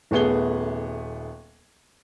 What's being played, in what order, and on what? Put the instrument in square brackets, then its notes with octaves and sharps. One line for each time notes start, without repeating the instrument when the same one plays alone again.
[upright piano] D#1 A3 B3 G#4 G7